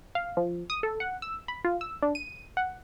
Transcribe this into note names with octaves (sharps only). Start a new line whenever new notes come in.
F5
F3
D#6
A4
F#5
E6
B5
F4
E6
D4
D#7
F#5